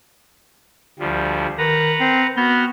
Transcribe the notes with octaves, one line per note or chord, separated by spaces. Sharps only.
D2 F3 G3
D#3 B4 F#5 A#5
C4
B3 F#4 F6 G6